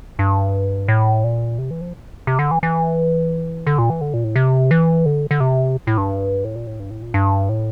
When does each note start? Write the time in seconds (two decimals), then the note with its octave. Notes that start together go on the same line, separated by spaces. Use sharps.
0.19 G2
0.88 A2
1.24 A#2
1.58 C3
1.70 E3
1.81 F3
2.27 C3
2.39 D3
2.51 E3
2.63 E3
3.67 D3
3.78 A#2
3.90 E3
4.01 D3
4.14 A#2
4.24 A2
4.36 C3
4.71 E3
5.06 D3
5.31 D3
5.40 C3
5.87 A2
5.98 G2
6.44 A2
6.55 A#2
6.67 A2
6.80 G2
6.91 A2
7.02 A#2
7.14 G2
7.49 A2